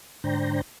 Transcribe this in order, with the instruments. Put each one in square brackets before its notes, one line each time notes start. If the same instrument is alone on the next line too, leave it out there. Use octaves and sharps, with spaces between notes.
[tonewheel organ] G#2 D3 D4 C5 G5 A#5